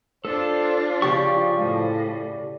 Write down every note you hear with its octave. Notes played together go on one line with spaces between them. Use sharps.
D4 F4 A4 C5
C#3 F3 G4 D5 C#6
A2